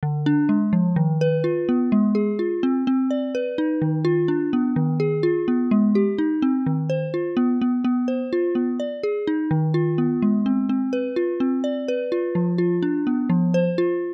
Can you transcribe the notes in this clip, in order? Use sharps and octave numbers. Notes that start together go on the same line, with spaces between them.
D3
D4
G#3
F3
D#3
B4
F4
B3
G#3
G#4
F4
C4
C4
D5
B4
D#4
D#3
F4
D4
B3
D#3
G#4
F4
B3
G#3
G4
D#4
C4
D#3
C5
F4
B3
B3
B3
C5
F4
B3
D5
G#4
D#4
D#3
F4
B3
G#3
C4
C4
B4
F4
C4
D5
B4
F4
F3
F4
D4
B3
F3
C5
F4